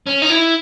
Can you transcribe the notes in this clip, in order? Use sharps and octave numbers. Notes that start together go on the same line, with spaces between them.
C#4
D#4
E4